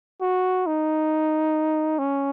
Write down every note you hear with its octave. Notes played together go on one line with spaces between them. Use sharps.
F#4
D#4
C#4